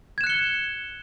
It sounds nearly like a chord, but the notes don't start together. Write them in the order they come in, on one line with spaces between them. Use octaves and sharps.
G#6 E7 F#6 C#7 G7